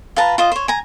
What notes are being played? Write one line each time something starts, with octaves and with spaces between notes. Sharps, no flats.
F4 B4 A5 A#5
F4 C5 D#5
C5 C#5
G#5 A#5